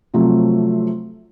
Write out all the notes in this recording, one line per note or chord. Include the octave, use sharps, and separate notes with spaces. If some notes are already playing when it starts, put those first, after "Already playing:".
C3 F3 F#3 A3